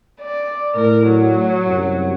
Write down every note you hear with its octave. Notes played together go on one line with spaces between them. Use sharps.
D5
A2 A#4
F#3
C2 F#2